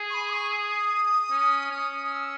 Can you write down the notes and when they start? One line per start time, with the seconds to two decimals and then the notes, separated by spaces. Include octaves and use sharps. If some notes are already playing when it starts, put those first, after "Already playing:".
Already playing: G#4
0.10 C#6
0.13 B5
0.29 D#6
0.33 C#6
0.50 E6
0.54 D#6
1.31 C#4
1.71 C#4
2.12 E6